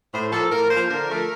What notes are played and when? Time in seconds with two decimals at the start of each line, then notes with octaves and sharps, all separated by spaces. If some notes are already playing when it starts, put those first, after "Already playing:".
0.13 A2 C5
0.32 F3 A#3 A4
0.51 A2 A#4
0.71 F3 A#3 C5
0.90 D3 A#4
1.10 F3 A3